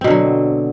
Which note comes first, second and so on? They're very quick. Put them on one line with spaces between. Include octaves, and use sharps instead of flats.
C4 B2 D3 F#3